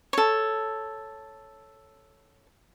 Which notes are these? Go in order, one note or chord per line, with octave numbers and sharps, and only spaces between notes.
A4 C#5